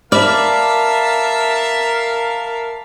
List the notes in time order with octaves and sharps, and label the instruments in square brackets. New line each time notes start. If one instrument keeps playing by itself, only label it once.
[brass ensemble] A#4 F5 [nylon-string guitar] D5 [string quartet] E5 A5 [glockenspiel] B5 D6 F6